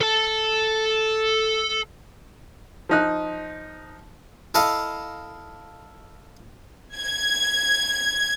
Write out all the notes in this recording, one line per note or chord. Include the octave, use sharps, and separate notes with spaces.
A4 A5
F3 D#4 F#6
E4 A4 D#5 F5
G#6